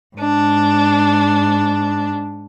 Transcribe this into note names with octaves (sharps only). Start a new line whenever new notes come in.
G#2 D4